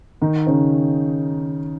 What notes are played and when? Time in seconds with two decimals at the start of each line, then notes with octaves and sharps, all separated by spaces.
0.21 D#3 D#4
0.47 C#3 C#4